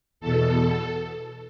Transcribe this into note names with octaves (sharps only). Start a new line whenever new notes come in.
E2 B2 A4